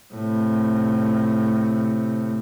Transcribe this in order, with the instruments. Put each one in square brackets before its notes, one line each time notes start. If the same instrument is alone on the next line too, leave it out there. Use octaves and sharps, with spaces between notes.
[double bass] A2 C3